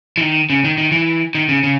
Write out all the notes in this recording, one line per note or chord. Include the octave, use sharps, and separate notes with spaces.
E3
D#3
C#3
D#3
D#3
E3
D#3
C#3
C#3